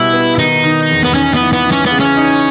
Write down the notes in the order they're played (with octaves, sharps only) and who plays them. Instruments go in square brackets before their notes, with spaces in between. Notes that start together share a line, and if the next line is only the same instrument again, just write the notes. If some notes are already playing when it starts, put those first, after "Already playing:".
Already playing: [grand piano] B2 G3 [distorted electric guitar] E4
[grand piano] B3
[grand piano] D#3 [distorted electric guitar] D#4
[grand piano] D#3
E2
[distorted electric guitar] B3
[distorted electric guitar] C#4 [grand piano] D#4
[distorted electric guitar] B3
[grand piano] E3
[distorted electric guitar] B3
[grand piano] E3
[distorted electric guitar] C#4
B3
[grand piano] C#3
[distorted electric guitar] C#4
[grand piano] D#4